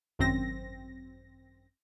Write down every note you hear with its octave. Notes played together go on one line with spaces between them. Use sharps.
G#1 F#2 C4 A#6